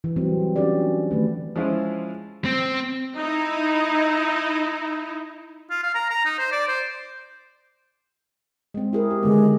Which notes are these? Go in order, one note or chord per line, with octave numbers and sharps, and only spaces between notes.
E3
F#3 G3 C4
C#4 D4 F#4 G4 A4 D5
D#3 A3 B4
F3 G#3 C#4 E4 F4
C4
D#4 E4
F4
F5
A#5
A#5
D#4
C5
D5
C5
G#3 C4
E4 G#4 A#4
G4
D3 D#3 G#3 B3